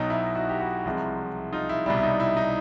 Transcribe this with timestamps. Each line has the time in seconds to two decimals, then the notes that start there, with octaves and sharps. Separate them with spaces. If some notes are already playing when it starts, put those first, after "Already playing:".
Already playing: B1 B2 F#3 D#4
0.10 E4
0.35 E4 F#4
0.49 G4
0.60 E4 F#4
0.85 C2 C3 F3 G#3
1.53 D#4 F4
1.69 E4
1.86 C2 B2 G3 E4
1.97 E4
2.03 D#4
2.20 E4
2.37 D#4